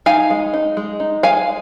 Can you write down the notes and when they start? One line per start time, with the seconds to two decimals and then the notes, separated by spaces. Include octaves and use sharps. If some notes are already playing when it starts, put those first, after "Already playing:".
0.06 D#4 F5 G#5
0.30 G#3
0.54 D#4
0.77 G#3
1.00 D#4
1.23 G#3 F5 G#5